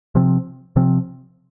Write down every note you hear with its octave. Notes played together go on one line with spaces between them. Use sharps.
C3 F3 C4
C3 F3 C4